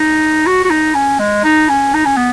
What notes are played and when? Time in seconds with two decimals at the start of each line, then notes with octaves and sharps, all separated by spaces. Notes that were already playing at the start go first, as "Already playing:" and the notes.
Already playing: D#4
0.46 F#4
0.65 F#4
0.70 D#4
0.95 C#4
1.19 G#3
1.44 D#4
1.69 C#4
1.94 D#4
2.05 C#4
2.17 B3